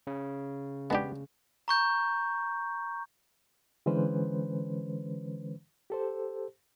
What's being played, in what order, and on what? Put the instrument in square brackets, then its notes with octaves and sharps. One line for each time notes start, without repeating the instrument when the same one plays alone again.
[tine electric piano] C#3
[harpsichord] G#3 D4 [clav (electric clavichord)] B3 G4
[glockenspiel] A#5 C#6 G6
[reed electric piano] D3 E3 G#3 C#4 B4 C5
G4 A4 C5